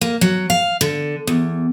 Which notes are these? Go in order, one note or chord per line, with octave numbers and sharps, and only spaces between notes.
A#3
F#3
F5
D3
E2